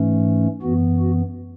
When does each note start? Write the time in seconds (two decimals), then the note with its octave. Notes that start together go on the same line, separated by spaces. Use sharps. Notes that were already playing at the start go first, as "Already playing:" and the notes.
Already playing: G#2 E3 A3 C#4
0.62 F#2 E3 B3 F#4
1.00 F#4